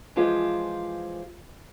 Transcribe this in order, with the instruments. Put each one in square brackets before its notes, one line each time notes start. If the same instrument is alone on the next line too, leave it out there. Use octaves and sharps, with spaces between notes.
[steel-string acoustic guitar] E3 F3 G#3 F4 G4 C5